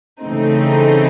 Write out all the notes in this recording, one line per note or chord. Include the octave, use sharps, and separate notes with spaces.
C#3 E3 A3 C4 D#4